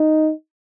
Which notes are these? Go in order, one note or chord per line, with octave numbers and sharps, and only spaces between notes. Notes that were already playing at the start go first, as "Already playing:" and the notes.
Already playing: D#4